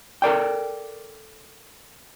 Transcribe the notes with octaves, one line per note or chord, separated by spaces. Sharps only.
A4 A#4 D5 G5